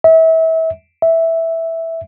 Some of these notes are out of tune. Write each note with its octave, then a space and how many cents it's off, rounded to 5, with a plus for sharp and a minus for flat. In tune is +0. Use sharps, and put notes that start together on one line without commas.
E5 -30
E5 -5